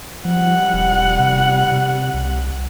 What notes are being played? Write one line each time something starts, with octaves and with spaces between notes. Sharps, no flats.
F3 G3 F#5
E1
C3
C3
C2